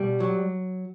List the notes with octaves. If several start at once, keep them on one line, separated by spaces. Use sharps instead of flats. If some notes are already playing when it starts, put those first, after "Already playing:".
Already playing: B2 G3
F#3